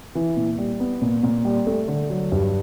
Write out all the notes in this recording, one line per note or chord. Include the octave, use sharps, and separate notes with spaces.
E3
A#2
G3
B3
A#2
A#2
G3
A3
D3
F#3
G2